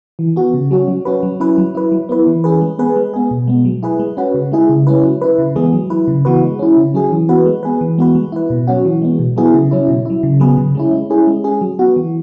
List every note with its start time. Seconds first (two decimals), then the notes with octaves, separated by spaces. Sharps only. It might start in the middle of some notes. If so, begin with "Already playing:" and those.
0.19 E3
0.36 B3 F#4
0.54 C#3
0.71 F#3 C#4 F#4
0.88 F#3
1.05 C#4 F#4 B4
1.23 F#3
1.40 C#4 E4 B4
1.58 F#3
1.75 E4 B4
1.92 F#3
2.09 B3 E4 B4
2.27 E3
2.44 C#4 G#4 B4
2.61 G#3
2.79 B3 G#4 B4
2.96 G#3
3.13 B3 G#4
3.31 B2
3.47 G#3 B3
3.65 F#3
3.83 E4 G#4 B4
3.99 G#3
4.17 C#4 F#4 B4
4.34 C#3
4.52 G#3 E4 G#4
4.69 C#3
4.87 G#3 C#4 E4 B4
5.03 F#3
5.21 E4 B4
5.38 C#3
5.55 E3 G#3 B3 G#4
5.73 F#3
5.90 E4 B4
6.08 C#3
6.25 E3 B3 F#4 B4
6.43 G#3
6.59 C#4 E4
6.77 C#3
6.94 F#3 C#4 G#4
7.11 E3
7.29 B3 F#4 B4
7.46 G#3
7.63 B3 G#4 B4
7.81 E3
7.98 G#3 B3 F#4 B4
8.15 G#3
8.32 E4 B4
8.50 B2
8.67 F#3 C#4 F#4
8.85 E3
9.02 G#3 B3
9.19 B2
9.37 F#3 B3 E4 G#4
9.54 C#3
9.71 F#3 C#4 E4
9.88 B2
10.05 F#3 E4
10.23 C#3
10.40 F#3 B3 G#4 B4
10.57 C#3
10.75 G#3 C#4 E4
10.92 G#3
11.10 C#4 E4 G#4
11.27 G#3
11.44 C#4 G#4
11.61 F#3
11.79 B3 F#4
11.96 E3